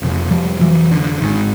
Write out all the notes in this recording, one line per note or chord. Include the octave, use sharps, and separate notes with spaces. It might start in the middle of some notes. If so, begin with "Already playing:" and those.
F1 F2 C#3
F3 G3
E3 F#3
D3
G#1 G#2 D#3